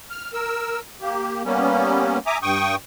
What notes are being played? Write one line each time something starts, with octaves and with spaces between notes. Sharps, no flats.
F6
A#4 E6
A#3 G4
G3 A#3 B3 C#4
E5 G#5 A#5 D6 D#6
G2 G5 C#6 D#6